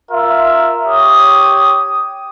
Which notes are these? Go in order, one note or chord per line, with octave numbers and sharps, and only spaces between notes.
F4 A#4 E5
G4 C#5 D#6